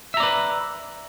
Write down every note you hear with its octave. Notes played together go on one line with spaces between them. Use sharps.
B4 D5 E5 A#5